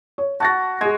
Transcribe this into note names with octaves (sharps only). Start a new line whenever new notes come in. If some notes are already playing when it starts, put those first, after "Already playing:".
C#5
F#4 A5 A6 A#6
G#3 G#4 G#6